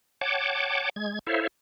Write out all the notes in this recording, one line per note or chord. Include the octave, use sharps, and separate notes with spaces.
C#5 F#5 G5 A5 D6
G#3 G#6
E4 A4 C5 C#5 E5 F5